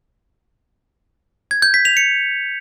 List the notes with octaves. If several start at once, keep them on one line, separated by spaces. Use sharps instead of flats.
G#6
G6
B6
F7
C#7